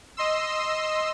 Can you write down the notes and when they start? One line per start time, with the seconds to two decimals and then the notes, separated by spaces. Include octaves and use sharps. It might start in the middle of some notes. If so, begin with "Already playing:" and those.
0.17 D#5 C6 E6